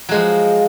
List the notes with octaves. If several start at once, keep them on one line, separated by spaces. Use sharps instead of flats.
F3 F#3 G#3